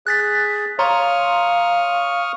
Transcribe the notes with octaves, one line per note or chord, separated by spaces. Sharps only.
G#4 F#6 A6 B6
C#5 F5 A#5 C6 C#6 D#6 F6